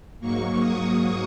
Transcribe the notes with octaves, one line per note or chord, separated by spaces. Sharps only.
G#2 F#3 A#3 C#6
D#6